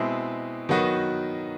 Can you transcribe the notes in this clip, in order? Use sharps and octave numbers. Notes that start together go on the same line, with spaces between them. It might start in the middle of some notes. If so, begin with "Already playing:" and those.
Already playing: B2 G#3 C4 E4
D#3 F#3 B3 D#4 F#4